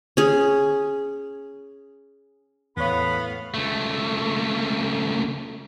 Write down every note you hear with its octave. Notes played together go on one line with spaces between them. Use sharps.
C#4 G#4
E2 A2 B3 C#5 F5 B5
C#2 A3